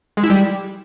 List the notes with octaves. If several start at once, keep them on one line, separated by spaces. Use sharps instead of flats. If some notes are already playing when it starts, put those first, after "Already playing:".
G#3
E4
G3